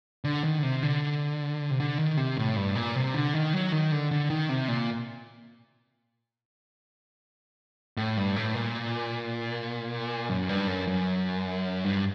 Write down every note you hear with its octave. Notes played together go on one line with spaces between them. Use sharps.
D3
D#3
D3
C3
D3
C3
D3
D#3
C3
A2
G2
A#2
C3
D3
D#3
F#3
D#3
D3
D3
D#3
C3
A#2
A2
G2
A2
A#2
F#2
G2
F#2
F#2
G2